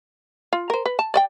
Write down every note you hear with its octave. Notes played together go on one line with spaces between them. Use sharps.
F4
A#4 C5
B4
A5
D5 D#5 G5